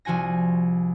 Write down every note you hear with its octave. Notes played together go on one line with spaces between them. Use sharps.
C2 F3 F#4 G#5 A#6